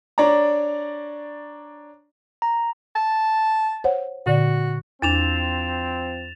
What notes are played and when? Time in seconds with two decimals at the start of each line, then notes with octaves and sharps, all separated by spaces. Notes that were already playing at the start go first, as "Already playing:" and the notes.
0.18 D4 C#5 D5 A#5
2.42 A#5
2.96 A5
3.84 C5 C#5 F#5
4.26 A#2 D3 F#4 D5
5.02 E2 F3 C4 D4 A6 E7 F7